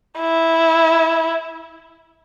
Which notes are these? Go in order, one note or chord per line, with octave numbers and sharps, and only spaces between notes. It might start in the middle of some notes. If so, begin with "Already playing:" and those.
E4